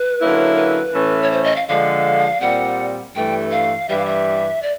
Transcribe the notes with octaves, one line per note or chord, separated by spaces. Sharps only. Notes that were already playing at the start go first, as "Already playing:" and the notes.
Already playing: B4
D3 F#3 A#3 C#4 E4
B4
A2 E3 A3 C#4
C#5
C5
D#5
F5
D3 F3 G#3 F5
A#2 G3 C4 F#5
G2 E3 A3 G5
F5
G2 E3 G3 E5
F5
E5
D5